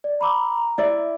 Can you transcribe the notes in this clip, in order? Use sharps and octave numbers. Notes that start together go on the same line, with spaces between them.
D5
A#5 B5 D6 E6
E4 D5 E5